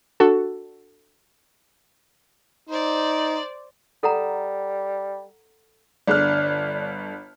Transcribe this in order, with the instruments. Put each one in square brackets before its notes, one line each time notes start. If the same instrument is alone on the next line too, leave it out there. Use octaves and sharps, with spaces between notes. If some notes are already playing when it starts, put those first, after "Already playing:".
[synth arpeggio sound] D4 F#4 A4
[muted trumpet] D#4 [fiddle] C5 D5
[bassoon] G3 [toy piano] A4 F#5 A#5
[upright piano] G1 D3 F6 [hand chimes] D5 F#6